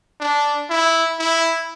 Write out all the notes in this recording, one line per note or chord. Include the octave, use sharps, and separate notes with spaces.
D4
E4
E4